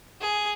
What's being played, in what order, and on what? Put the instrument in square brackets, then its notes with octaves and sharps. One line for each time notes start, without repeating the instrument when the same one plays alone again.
[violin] G#4